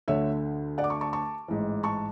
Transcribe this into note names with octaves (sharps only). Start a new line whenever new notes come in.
D2 D3 C#5 E5
D5 F#5
D6
A5 C#6
A5 C#6
A5 C#6
A1 G#2 E3
A5 C#6